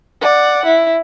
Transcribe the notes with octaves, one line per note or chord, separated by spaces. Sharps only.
D5 F#5
E4